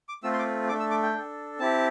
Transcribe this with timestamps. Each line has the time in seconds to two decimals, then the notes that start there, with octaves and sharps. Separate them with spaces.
0.09 D6
0.23 A3 C4 F4 A4 E6
0.33 C6
0.39 D6
0.69 A3 D4 A4 D6
0.80 E6
0.91 D6
1.03 G5
1.14 D4 A4
1.59 C4 E4 G4 A5